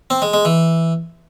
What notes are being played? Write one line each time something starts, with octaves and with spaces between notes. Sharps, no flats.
C4
G#3
G#3
E3